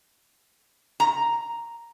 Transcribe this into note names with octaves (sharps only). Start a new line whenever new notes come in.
A#5